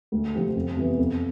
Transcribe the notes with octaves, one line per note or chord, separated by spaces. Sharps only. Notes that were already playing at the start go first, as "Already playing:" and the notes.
D2
C3 F3 C4 G4
F2
C3 E3 B3
F2